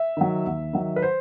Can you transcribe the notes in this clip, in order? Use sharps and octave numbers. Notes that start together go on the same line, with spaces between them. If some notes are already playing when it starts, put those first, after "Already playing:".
Already playing: E5
D#3 F#3
D#2
D#3 F#3
B4
C5